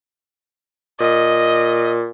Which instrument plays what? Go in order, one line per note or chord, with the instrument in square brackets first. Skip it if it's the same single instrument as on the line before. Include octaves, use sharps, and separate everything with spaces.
[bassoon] A#2 [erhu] D#5